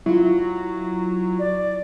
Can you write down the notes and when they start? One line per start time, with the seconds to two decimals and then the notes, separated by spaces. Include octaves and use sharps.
0.06 F#3 E4 F4
1.39 D5